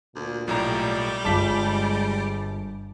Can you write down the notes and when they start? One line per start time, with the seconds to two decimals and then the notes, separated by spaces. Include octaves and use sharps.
0.16 D2 A#2
0.48 B1 A2 G3 A#5
1.25 G1 G#3 F4 A5 D6 B6